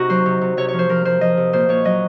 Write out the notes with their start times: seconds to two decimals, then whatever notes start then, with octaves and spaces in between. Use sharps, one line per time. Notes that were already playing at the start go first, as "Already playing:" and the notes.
Already playing: C3 D#4 F#4
0.10 F#3 C5
0.26 C3
0.41 C3
0.57 C3 C#5
0.68 C#5
0.73 F3
0.79 C5
0.89 F3 A#4
1.05 F3 C5
1.21 F3 D#5
1.37 C3
1.53 A#2 C5
1.69 A#2 C#5
1.85 F#3 D#5